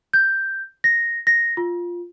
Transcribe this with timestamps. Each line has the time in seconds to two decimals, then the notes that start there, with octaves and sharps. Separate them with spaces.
0.13 G6
0.84 A#6
1.27 A#6
1.57 F4